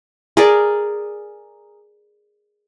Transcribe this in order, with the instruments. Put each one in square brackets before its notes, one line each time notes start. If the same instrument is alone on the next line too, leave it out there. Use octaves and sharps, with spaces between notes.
[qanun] G#4 A#4 D5